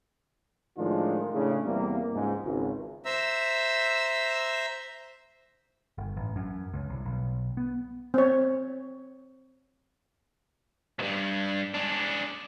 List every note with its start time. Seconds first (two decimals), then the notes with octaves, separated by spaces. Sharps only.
0.78 A2 D#3 F3 G#3 D4 F4
1.33 A2 C#3 D4
1.65 E2 C3 G3 A#3
2.14 C#2 G#2
2.45 G#1 C#2
3.05 C5 E5 A#5 E6
5.98 G1
6.16 A1
6.36 F#2
6.74 C#2
6.90 C2
7.05 B1
7.57 B3
8.14 C4 C#5
10.99 C#2 G2
11.75 G#3 D4